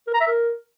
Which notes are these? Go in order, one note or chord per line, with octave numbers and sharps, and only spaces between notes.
A#4
A#5
E5
A#4